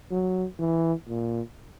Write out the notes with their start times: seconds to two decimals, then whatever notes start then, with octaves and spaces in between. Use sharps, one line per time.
0.11 F#3
0.59 E3
1.08 A#2